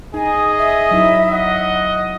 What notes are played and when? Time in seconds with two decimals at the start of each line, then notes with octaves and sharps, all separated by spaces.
0.14 D#4 G#4 D#5 G#5
0.58 E5
0.91 F#3 D#4 E4
1.33 D#5 F#5